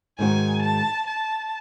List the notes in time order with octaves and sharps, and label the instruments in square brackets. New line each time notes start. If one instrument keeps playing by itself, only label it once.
[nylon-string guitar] G#2 D#3 G#3 C4 F#4 [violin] G#5
[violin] A5
A5